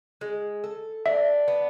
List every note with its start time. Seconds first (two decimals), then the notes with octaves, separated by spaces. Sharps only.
0.21 G#3
0.64 A4
1.06 D4 E5
1.48 B3